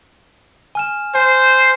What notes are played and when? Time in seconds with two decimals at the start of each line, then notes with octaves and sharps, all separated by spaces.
0.75 G#5 F6 E7
1.15 C5 G#5